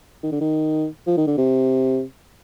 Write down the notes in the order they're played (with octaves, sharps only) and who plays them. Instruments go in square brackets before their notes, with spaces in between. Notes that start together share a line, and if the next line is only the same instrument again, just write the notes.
[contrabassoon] D#3
D3
D#3
F3
D#3
D3
C3